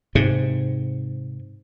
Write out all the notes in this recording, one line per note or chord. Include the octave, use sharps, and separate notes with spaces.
G#2 C3